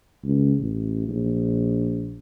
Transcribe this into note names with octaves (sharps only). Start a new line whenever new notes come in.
C#2
A1
A#1